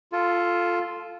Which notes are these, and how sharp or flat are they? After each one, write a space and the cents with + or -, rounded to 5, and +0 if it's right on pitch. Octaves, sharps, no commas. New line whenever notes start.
F4 +0 A4 +0 A5 -35